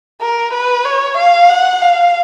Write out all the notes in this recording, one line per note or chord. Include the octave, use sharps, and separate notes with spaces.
A#4
B4
C#5
F5
F#5
F5